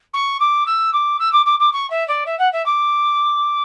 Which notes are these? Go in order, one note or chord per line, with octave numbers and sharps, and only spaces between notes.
C#6
D6
E6
D6
E6
D6
D6
D6
C#6
E5
D5
E5
F#5
E5
D6